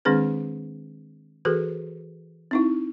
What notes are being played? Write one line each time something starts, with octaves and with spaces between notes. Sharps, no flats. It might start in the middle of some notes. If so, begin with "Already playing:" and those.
D#3 G#3 C4 D4 G#4 B4
E3 F#4 G#4 A4 B4
C4 D#4 E4